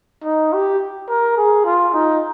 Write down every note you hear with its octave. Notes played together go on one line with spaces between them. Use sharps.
D#4
G4
A#4
G#4
F4
D#4